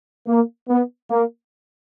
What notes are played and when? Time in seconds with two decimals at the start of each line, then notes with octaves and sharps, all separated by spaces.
0.27 A#3
0.69 B3
1.10 A#3